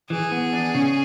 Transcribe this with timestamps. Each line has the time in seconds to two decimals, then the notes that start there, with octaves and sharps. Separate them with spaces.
0.10 E3 G#4
0.32 B3
0.53 D4
0.75 C#3